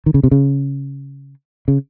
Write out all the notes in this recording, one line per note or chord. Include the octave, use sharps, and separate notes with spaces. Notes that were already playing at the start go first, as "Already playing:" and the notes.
D#3
C#3
C3
C#3
C#3